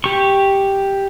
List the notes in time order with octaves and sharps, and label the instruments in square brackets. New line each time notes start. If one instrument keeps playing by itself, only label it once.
[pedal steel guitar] G4 C#6